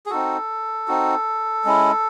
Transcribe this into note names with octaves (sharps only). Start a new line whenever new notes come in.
G#4
C4 D#4 F#4 A4
C4 D#4 F#4
G#3 C#4 E4